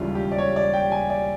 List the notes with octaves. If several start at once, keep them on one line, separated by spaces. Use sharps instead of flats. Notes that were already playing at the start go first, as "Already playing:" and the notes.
Already playing: E1 D#2 C#3 E3 G3 E4 F4
G4
D5
C#5
D5
G5
G#5
D5